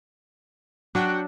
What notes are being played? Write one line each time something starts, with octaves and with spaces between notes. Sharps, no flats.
F#3 D4 F#4 F#5 G5